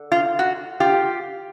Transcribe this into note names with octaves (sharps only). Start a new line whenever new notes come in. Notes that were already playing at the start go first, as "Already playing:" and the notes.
Already playing: D3
F4
F#4
F4 G4